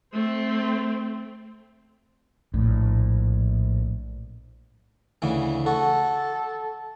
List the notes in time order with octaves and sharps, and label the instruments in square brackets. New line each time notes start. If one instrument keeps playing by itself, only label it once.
[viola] A3 C4
[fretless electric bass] A#1 A2
[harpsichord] D2 C#3 E3
[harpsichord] F#4 [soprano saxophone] A4